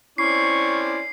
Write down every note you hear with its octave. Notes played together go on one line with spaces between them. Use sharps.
C4 C#4 E4 D5 C#6 C7